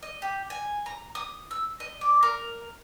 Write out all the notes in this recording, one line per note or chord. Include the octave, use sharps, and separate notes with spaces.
D#5
G4
G#5
A#5
D#6
E6
D#5
D5
A#4